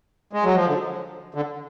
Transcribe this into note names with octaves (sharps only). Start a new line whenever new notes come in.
G#3
F#3
F3
D3
D3